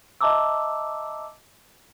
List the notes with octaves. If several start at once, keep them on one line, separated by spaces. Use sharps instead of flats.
D#5 E5 A5 A#5 D6 E6